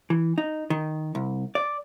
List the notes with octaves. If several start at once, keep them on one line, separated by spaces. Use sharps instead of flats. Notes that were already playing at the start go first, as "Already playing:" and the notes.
E3
D#4
D#3
C2
D5